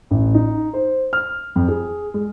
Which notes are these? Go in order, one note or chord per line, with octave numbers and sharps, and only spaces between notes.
A1
D#4
C5
F6
F2
G#4
G#3